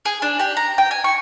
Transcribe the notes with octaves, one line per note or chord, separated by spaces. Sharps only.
G#4
D4
G4
A#5
G5
G#5
C#6